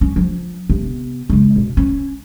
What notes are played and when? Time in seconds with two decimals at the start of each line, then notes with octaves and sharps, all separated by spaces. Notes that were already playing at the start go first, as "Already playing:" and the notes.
0.01 C#4
0.16 F3
0.69 C3 B3
1.30 C#3 G#3
1.56 B2
1.77 C#4